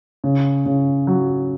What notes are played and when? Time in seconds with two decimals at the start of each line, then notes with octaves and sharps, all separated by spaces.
0.24 C#3
0.66 C#3
1.07 F#3